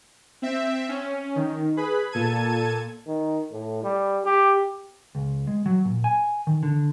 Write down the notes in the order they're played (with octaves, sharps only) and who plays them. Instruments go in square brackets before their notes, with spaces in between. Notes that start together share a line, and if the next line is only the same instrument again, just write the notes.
[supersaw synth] C4 E5
C#4
D#3
G#4 B4 B5
A#2 A4 A5 G#6 D#7
[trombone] D#3
A2
G3
G4
[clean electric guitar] C#2
G#3
F#3
A#2
G#5
D#3
D3